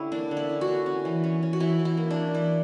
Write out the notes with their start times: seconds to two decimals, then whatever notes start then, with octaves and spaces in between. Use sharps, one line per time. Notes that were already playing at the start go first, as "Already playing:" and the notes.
Already playing: D3 C#4 E4 G4
0.12 A#3 D4
0.31 D3
0.37 E4
0.49 C#4
0.61 F#4
0.68 D3
0.86 C#4
1.05 E3
1.24 C#4
1.43 C#4
1.53 F#4
1.60 E3 E4
1.79 E3
1.85 E4
1.97 A#3
2.11 D4
2.16 E3
2.35 E3 E4